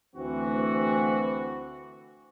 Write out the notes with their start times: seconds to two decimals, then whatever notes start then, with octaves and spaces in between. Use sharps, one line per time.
0.16 D2 E3 C4 F#4